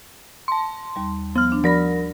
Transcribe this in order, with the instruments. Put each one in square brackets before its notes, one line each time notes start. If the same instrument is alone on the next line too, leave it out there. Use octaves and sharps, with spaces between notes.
[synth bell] A5 C6
[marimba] D#2 G3
[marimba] F3 [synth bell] B3 F6
[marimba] D4
[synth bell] F3 A#4 A#6 [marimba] D5 B5